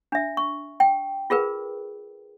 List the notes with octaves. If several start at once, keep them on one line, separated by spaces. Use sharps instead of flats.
D4 E5
C#6
G5
F4 G#4 A#4 B4